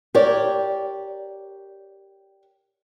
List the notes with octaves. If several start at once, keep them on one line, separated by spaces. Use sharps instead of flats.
G4 A#4 C#5 D5